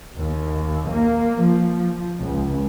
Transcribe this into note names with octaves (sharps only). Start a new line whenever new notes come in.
D#2
A#3
F3
C#2